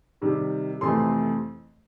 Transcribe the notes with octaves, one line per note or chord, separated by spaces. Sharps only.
C3 D#3 G3
F2 C3 E3 A3 C4 C6